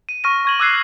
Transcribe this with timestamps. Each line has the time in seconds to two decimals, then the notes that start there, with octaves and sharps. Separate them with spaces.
0.09 D#7
0.24 C#6 F6 A#6 D#7
0.45 C#6 G#6 F#7
0.59 D6 E6 F#6 G#6 C7